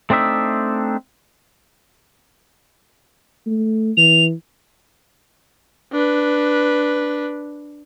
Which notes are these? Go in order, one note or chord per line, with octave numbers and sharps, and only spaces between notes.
A3 C4 D4 D#4 E5
A3
E3 F7
D4 B4